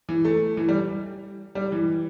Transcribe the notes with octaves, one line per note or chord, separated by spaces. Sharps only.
E3
A3
E3
G3
G3
E3